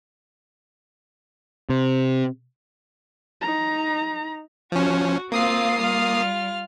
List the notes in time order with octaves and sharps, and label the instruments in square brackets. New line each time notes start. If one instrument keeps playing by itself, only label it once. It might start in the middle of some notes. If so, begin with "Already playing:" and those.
[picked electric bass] C3
[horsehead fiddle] D#4 A#5
[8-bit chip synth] F3 C#4 [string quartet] F#4
[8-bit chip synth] A#3 D#6 C7 [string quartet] C4 F4 F5
[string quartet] G3 F4 F6